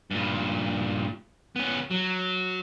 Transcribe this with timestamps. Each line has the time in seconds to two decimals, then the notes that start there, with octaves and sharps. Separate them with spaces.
0.11 G2 A#2
1.56 B3 C#4
1.91 F#3